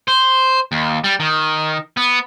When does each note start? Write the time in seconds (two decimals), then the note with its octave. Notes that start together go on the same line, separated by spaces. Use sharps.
0.08 C5
0.72 D#2
1.04 G3
1.20 D#3
1.97 B3